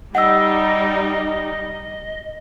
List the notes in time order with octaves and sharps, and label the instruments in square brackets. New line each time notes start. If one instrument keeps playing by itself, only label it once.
[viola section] G3 D#4 [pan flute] D#5 [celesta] F#5 E6